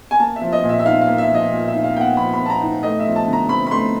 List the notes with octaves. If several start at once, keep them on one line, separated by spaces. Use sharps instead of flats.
G#5
A#3 A5
E5
F3
D#5
A#2
E5
E5
D#4 F5
F5
A#3
E5
F3 D#5
A#2
E5
D#4
F5
A#3 G5
F#5
F3 B5
B5
A#2
A5
A#5
D#4
A3 D#5
E5
F3
A5
D3
A#5
C4 B5
B5
A3 C6